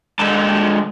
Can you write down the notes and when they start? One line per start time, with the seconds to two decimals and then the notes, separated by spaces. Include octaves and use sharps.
0.19 D3 G#3 A5